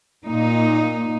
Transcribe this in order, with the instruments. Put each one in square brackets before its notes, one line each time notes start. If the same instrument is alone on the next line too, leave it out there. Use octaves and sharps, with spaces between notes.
[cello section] A#2 D#4